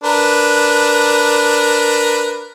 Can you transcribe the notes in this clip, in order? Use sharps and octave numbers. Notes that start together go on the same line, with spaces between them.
D4 A#4 B4